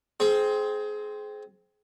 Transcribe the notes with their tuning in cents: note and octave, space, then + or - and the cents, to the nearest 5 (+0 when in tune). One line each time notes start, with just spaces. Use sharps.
C4 +0 G#4 +25